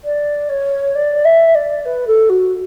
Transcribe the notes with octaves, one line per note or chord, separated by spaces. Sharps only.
D5
C#5
D5
E5
D5
B4
A4
F#4